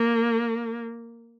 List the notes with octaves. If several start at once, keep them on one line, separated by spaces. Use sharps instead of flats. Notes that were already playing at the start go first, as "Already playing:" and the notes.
Already playing: A#3